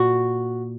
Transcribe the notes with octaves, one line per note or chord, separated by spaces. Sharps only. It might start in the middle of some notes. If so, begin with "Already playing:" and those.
Already playing: A#2 F#4